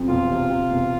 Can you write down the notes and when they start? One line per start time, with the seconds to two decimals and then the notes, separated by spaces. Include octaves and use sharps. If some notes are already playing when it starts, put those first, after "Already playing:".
Already playing: F2
0.08 E1 F4
0.30 C3
0.50 C3
0.71 E1